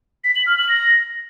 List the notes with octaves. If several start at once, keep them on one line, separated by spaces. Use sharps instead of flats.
B6
F#7
F6
F#7
A#6